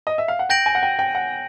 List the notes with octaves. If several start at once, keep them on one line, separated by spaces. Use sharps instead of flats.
D#5
E5
F5
F#5
G5 G6 A#6 D7 F#7
G#5
F#5
G5
G5
F#5